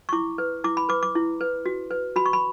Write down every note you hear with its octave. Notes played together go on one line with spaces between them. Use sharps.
C#6
E4 D6
B4
E4 D6
B5
B4 D6
D6
E4
B4
F#4
B4
F#4 B5
C#6
B5